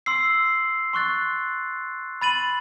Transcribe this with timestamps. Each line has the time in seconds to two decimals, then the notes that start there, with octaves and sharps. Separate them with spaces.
0.06 C6 E6 C7
0.93 C6 C#6 F#6 A6
2.21 B5 A6 D#7 F#7